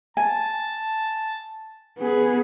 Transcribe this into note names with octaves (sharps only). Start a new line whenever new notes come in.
G#5 A5
B3 G#4